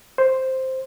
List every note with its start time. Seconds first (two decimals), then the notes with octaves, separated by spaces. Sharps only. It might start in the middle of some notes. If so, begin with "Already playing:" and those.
0.18 C5